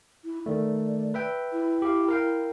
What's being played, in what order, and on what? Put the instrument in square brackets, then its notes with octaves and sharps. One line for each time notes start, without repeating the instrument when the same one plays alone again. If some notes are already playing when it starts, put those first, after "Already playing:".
[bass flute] E4
[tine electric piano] D#3 A3 [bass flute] D5
[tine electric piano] B4 E5 G5
[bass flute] E4
[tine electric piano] G4 F5
A#4 F5 G5